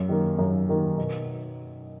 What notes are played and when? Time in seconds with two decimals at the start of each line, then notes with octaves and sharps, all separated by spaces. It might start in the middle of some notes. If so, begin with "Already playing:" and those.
Already playing: F#2
0.09 D#3 A#3
0.39 F#2
0.69 D#3 A#3
0.98 B2